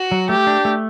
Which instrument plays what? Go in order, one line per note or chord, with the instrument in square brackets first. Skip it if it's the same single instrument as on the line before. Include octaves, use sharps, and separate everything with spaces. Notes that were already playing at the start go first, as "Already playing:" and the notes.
Already playing: [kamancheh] F#4
[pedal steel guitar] F#3
[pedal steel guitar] A3 [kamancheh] G4
[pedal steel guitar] D4
A3